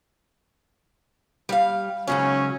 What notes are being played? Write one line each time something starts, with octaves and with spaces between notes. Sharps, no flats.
G3 F5
G#2 C#3 F#3 C#4